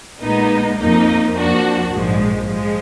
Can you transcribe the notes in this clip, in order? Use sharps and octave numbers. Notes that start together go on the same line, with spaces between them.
A#1 A#2 G#3 B3 D#4
F2 F3 A#3 D#4
F2 F3 A#3 D4 F#4
A#1 G#2 F3 G#3
F3 G#3